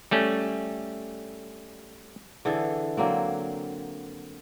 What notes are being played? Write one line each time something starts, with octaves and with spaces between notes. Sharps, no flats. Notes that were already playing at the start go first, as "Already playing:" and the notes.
G3 A3 C#4
D3 E3 G#4 A4
D3 F#3 A#3 C4